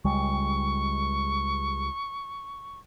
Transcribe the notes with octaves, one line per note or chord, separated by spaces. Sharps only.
C#2 G3 G#3 C#6